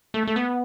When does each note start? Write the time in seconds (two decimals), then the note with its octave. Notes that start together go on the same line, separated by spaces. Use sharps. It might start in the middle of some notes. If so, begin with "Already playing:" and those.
0.14 A3
0.27 A3
0.36 B3